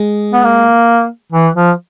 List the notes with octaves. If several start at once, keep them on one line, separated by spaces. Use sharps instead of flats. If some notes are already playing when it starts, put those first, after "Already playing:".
Already playing: G#3
B3
A#3
E3
F3